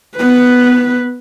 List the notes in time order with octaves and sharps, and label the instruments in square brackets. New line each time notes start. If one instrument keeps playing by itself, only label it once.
[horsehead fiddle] B3 B4